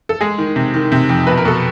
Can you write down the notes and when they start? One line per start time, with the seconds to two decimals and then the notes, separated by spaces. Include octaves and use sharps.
0.09 A4
0.21 G#3 G#4
0.38 D#3
0.56 C3
0.74 D#3
0.92 C3
1.09 F2
1.27 B2 B4
1.38 A#4
1.45 B2 A4